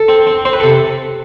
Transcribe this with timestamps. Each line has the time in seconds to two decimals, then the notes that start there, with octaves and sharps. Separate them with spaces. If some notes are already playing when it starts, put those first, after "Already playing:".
Already playing: A4
0.08 C4
0.27 C4
0.45 C4 C5
0.53 B4
0.60 A4
0.63 C3